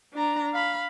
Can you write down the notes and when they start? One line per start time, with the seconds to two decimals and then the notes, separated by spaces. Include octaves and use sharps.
0.14 D4 A#5
0.54 F5 B5